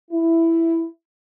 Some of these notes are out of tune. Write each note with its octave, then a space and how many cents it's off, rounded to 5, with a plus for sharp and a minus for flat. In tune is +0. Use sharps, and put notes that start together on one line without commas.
E4 +5